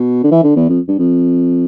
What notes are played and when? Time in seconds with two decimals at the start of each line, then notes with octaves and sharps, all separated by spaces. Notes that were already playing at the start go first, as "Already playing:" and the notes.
Already playing: B2
0.24 D3
0.31 E3
0.44 D3
0.56 E2
0.69 F2
0.88 G2
0.99 F2